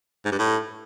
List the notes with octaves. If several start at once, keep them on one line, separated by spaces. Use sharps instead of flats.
G#2
G2
A2